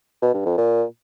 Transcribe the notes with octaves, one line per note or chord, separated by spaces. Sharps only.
B2
G2
F2
A#2